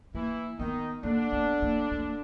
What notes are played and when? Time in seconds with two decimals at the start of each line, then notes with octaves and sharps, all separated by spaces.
0.14 E3 A#3 E4
0.59 D#3 B3 D#4
1.03 D3 A#3 D4
1.33 B3
1.62 A#3
1.92 A3
2.01 A#3